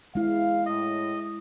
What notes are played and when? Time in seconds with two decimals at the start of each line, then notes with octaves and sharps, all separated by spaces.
0.15 E2 G#3 E4 F5
0.66 A2 D#5